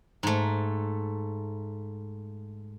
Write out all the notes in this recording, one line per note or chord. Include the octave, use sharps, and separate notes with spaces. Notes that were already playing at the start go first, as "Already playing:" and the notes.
G#2 A3